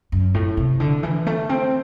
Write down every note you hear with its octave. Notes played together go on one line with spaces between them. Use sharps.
F#2
A2
C3
D3
E3
A3
C4